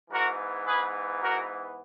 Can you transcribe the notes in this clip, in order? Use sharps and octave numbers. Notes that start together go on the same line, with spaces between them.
G#2 E3 B3 F#4 A#4
G#4 B4
F#4 A#4